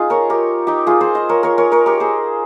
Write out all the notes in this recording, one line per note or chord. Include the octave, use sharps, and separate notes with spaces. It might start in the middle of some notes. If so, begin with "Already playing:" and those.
Already playing: D#4 F4 G#4
A#4 C#5
G4 A#4
D#4 G4
F4 G#4
G#4 C5
C5 D#5
A#4 C#5
A#4 C#5
A#4 C#5
A#4 C#5
G4 A#4
G#4 C5